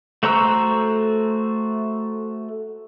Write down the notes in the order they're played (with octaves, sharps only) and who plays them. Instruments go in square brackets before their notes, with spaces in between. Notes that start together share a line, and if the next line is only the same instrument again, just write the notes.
[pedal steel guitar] A3 F#4 C5 A#5 E6